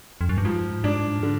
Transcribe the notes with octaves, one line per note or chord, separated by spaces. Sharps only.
F2
F#2
G2
G#2 F3
G#2 D4
D3